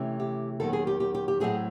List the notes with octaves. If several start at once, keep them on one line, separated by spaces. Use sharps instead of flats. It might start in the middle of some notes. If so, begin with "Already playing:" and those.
Already playing: C3 E3 A3 C#4
G4
D#2 D#3 F#3 B3 A4
G#4
G4
G4
G4
G4
A2 F#3 A3 C4 G#4